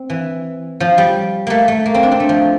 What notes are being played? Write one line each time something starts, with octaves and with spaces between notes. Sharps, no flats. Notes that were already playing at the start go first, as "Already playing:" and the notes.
Already playing: C4
E3
F3
G3
A3 A#3
A3
A#3
C4
D4
C4
A3
F3